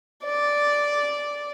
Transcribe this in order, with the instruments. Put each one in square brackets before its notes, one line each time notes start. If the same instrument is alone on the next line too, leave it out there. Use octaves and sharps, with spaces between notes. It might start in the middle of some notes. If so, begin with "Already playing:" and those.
[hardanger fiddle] D5